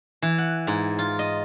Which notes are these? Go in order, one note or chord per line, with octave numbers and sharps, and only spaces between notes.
E3
F#5
G#2
F4
D#5